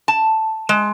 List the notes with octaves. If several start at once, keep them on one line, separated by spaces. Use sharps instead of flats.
A5
G#3